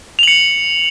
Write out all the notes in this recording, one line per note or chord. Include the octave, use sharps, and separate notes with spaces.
C#7 F7 F#7